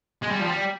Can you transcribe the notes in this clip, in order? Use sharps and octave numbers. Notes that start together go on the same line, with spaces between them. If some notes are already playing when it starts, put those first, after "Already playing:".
G#3
G3
F3
G3